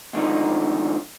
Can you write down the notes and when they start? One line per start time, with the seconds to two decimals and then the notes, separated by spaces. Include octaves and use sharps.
0.13 D2 G#2 D3 D#3 F3 D#4